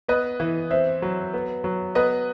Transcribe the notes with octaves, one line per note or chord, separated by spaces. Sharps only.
B3 B4 D#5
E3
C4 C5 E5
F#3
B3
F#3
B3 B4 D#5